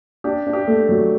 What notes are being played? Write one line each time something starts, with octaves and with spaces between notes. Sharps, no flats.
D4 G4
D4
G4
A3
F#3